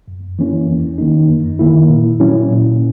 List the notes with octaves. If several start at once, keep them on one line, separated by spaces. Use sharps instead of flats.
F#2
E3 A#3 C#4 E4
E2
D#3 A#3 D#4
F#2
D#3 A#3 E4
A#2
F#3 C#4 E4
A#2